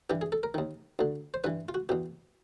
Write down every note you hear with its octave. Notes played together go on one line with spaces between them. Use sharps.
G2 E3 G4
G#4
A4
A#4
D#2 D#3
D2 D3
C5
G2 E3 B4
F4
F#4
E2 B2 G4